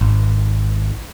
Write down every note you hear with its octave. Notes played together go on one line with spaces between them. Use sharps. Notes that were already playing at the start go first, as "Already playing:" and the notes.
G#1